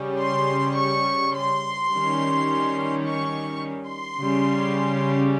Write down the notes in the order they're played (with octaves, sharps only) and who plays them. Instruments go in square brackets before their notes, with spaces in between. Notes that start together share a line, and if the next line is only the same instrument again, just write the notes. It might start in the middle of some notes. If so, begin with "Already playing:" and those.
Already playing: [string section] C#3 G3 C#4
C6
C#6
C6
D#3 G3 C#4
C#6
C6
C#3 G3 C#4